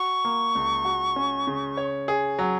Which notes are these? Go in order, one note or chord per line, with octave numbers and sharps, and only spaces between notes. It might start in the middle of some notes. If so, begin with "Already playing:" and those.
Already playing: F#4 C#6
A#3
C#2
F#4
C#4
C#3
C#5
G#4
F#3